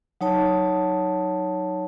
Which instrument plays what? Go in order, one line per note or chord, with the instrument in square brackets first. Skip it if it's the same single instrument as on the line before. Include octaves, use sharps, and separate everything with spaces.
[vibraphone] F#3 D#4 C#5 A5